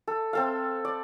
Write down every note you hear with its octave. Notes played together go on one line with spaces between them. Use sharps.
A4
C4 A4 F5
D5